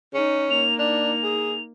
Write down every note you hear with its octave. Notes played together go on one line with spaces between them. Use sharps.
C#4 D#4
A#3 D#4 F7
D4 F7
G#4